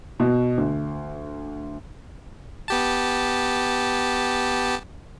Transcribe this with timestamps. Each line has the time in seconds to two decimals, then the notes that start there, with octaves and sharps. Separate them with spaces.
0.20 B2
0.57 D2
2.68 B3 G4 A5